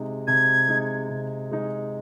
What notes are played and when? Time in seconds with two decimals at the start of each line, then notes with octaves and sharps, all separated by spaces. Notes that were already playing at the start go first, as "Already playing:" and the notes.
Already playing: C3 G#3 D#4
0.27 C3 G#6
0.68 G#3 D#4
1.09 C3
1.52 G#3 D#4